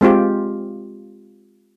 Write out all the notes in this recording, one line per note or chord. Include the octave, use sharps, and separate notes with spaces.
G#3 C4 F4 G4